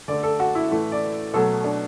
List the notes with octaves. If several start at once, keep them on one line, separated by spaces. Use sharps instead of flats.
D3 A3 D5
A4
F#4
E4
A2 E3 A3
D5
B2 F#3 A3 A4
D4